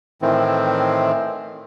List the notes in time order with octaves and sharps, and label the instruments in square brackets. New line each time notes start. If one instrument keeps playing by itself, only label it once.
[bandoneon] A2 D#3 E3 C4